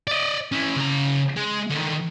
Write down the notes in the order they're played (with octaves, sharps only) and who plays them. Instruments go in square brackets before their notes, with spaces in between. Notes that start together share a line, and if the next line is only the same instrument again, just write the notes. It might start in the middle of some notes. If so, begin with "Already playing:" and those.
[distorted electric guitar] D5 D#5
C#4 E4
C#3 A#5
G#3
D3 D#3